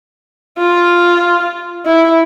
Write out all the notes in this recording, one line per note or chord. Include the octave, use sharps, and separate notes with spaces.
F4
E4